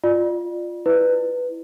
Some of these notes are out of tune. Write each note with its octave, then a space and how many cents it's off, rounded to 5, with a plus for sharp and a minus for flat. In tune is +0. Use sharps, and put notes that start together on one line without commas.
F4 +0 D5 +25
E4 +0 B4 +5